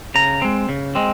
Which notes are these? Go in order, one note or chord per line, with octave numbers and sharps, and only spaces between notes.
C#3 A#5
G#3 C4
C#3
G#3 C4